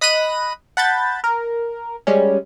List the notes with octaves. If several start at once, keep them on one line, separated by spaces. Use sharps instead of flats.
D#5 B5 F#6 A#6 D#7
F#5 A5 B5 G6 A6
A#4
G3 G#3 C#4